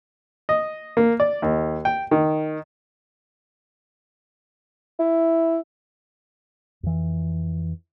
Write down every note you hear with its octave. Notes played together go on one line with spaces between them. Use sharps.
D#5
A#3
D5
D#2
G5
D#3
E4
F2 E3